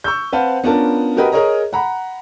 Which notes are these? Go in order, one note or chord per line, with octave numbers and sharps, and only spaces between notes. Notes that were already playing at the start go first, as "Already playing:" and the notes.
C#6 E6 G6
C4 B4 C5 F5 F#5 A5
B3 C#4 D4 F4 A#4 A5
F#4 G4 A#4 B4 D#5
G#4 A#4 C#5 D#5 A#5
F#5 A#5 B5